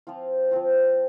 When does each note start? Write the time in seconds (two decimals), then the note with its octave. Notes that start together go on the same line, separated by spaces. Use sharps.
0.07 F3 C4 F4
0.51 F3 C4 F4